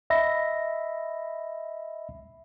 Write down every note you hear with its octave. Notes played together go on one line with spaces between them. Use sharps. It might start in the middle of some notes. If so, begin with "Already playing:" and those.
D#5 E5 B5 A#6